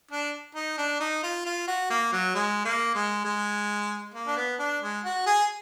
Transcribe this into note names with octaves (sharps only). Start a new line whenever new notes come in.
D4
D#4
D4
D#4
F4
F4
F#4
A#3
F#3
G#3
A#3
G#3
G#3
A#3
D4
B3
D4
G#3
F#4
G#4